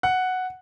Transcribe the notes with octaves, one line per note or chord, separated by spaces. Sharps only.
F#5